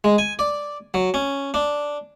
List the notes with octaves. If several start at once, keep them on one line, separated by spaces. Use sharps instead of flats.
G#3
G#5
D5
F#3
C#4
D4